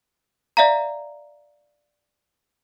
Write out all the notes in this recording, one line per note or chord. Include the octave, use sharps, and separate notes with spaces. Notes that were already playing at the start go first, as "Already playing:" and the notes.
D5 E5 F5 A#5